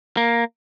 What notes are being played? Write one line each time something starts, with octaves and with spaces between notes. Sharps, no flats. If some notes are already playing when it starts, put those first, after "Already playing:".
A#3